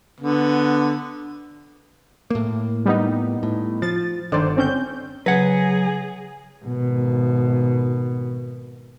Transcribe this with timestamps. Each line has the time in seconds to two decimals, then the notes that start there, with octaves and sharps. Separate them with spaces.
0.20 D3 B3
2.30 A2 A#3
2.86 G3 B3 D#4
3.43 A2
3.82 F3 A6
4.32 G1 D3 D#3 C5 D5
4.57 C4 C#4 G6
5.26 C#3 F#3 G#4 B4 F#5 G#6 A#6
6.65 G#1 B2